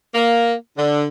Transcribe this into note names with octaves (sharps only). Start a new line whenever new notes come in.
A#3
D3